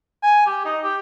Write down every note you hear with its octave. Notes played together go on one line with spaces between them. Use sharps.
G#5
G4
D#4
G4